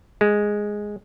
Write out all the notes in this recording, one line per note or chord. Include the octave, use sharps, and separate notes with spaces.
G#3